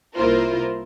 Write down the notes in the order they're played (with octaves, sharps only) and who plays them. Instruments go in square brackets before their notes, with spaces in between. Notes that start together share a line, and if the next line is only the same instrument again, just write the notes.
[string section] C2 A#3 E4 F4 A#4 C5